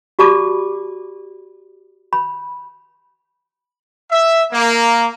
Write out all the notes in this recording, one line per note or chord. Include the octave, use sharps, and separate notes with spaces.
F#4 G4 D5 A5 B5 D6
B5
E5
A#3